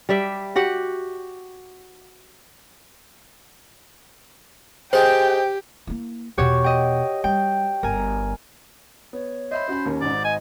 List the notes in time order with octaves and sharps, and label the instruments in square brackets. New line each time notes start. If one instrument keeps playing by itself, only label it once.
[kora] G3 D5 E5 G5
F#4 G4 F#5
[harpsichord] G#3 A4 D#5 [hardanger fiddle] G4 [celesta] C5 [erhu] G5
[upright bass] A#3 E4
[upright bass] E2 B2 [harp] F#4 G4 C#5
[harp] D#5 G5
[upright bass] G3 [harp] G5
[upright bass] G1 [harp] A#4 G#5
[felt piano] B3 [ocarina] C#5
[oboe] C5 [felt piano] D#5 E5 B5
[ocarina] C#4 [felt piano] F#4 B5
[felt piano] D#2 A#3
[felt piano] G#1 G#2 [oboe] D5
[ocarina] D#5 [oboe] G#5